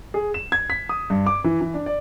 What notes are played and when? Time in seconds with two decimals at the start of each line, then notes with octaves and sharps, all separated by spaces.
0.14 G#4
0.34 E7
0.52 G#6
0.70 B6
0.89 D#6
1.10 G2
1.26 D6
1.44 E3
1.61 E3
1.74 D4
1.86 D5